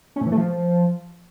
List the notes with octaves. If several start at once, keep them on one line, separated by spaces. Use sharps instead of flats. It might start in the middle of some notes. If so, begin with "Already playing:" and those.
C#4
A2
E3
A3
F3